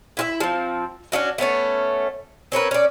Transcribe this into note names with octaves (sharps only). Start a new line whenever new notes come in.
E4 F4 E5
F3 C4
C#4 D4 E4 F#4
A3 B3 C#4 C#5
C4 C#4 A#4 B4
C#4 D5